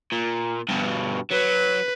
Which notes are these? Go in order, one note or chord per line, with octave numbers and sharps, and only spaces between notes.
A#2
G2 B2
F#3 B4